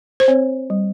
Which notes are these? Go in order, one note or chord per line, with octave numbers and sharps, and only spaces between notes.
C5
C4 C#5
G3